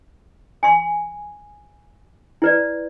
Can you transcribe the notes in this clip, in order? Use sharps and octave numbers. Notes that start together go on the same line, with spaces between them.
G#5 C6
E4 B4 D5